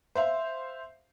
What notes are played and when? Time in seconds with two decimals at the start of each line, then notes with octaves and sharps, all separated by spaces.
0.15 C5 E5 F5